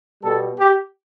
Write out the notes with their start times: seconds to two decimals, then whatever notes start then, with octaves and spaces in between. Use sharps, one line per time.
0.21 B2 G3 A4
0.58 G4